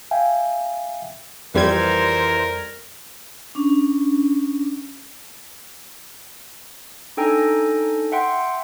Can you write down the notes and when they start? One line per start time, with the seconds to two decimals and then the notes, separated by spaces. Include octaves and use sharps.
0.11 E5 F5 G5 G#5
1.55 F2 E3 G3 A#4 C5 G#6
3.55 C#4 D4
7.17 D4 D#4 A4 G5 G#5 A#5
8.12 E5 F#5 G5 C6